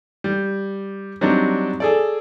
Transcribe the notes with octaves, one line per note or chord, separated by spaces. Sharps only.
G3
F#3 G3 C4 D4 D#4
G#4 A4 D5